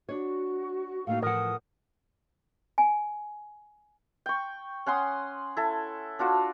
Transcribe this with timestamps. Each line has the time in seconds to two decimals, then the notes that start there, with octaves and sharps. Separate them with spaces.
0.09 D4 F#4 C#5
1.07 A2 A#3 D#4 F5
1.22 A2 E3 F3 A#4 F#5 D#6
2.78 G#5
4.26 G5 C#6
4.86 C#4 F#5 C6 D#6
5.57 E4 A4
6.19 D4 F4 F#4 D5